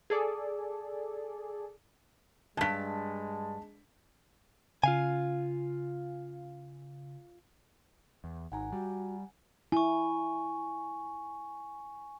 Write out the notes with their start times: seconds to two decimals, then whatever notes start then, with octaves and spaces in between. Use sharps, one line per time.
0.10 G#4 A4 D5
2.57 E2 G2 G#3 A5 B6
4.84 C#3 F4 F5 G#5
8.24 E2
8.52 G#1 D#4 F#5 G#5 A#5
8.72 G3 F#4
9.72 E4 G#5 C#6